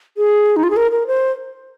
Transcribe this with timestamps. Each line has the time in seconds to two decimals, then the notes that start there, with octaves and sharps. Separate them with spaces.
0.17 G#4
0.56 D#4
0.63 F4
0.70 G#4
0.76 A#4
0.91 A#4
1.07 C5